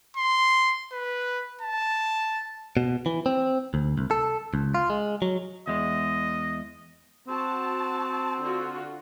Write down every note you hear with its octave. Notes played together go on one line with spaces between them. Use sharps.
C6
B4
A5
B2
E3
C4
D2
C2
A4
C#2
F4
G#3
F#3
E2 G#3 D#5
C4 F#4 A5
D3 F4 F#4